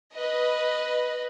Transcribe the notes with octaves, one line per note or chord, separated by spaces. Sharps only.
B4 D#5